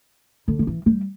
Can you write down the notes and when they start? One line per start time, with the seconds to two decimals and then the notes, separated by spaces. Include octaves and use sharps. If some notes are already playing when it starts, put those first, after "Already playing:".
0.48 D3
0.59 F#3
0.67 E3
0.86 G3